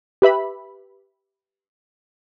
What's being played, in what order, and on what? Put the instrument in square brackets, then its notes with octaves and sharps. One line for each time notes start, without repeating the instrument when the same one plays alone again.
[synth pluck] G4 B4 E5 B5